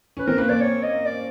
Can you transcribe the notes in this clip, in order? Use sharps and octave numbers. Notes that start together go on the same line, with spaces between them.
C#4 B4
C4 A#4
A#3 B4
A#3 D5
C#5
D#5
D5